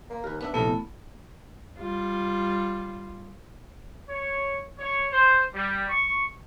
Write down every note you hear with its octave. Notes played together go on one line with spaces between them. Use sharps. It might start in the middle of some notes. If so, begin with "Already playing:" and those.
A#3
D#2 A#4 B4
B3 D4 B4 E5
A#1 C3 A3 B3 C#4 E4 A4
G3 F4
C#5
C#5
C5
G3
C#6